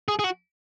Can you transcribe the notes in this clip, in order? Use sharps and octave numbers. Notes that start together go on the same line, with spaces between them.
G#4
G#4
F#4